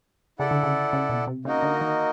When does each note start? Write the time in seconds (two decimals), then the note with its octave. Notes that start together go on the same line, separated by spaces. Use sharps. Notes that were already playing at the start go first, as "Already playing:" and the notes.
0.39 C#3 E4 A4 D5 F#5
0.51 D3
0.63 C#3
0.93 C#3
1.10 B2
1.27 C3
1.45 C#3 A#3 D#4 F#4 A#4 D#5
1.63 D3
1.81 D#3